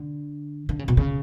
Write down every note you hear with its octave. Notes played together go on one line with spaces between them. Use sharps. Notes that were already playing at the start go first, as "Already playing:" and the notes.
Already playing: D3
D3
C#3
B2
C#3